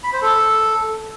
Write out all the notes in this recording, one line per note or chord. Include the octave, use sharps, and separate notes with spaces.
B5
C5
A4